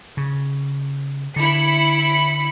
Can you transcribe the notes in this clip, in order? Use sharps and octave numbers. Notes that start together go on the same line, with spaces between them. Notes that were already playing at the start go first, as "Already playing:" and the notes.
C#3
D3 E4 B5 C#7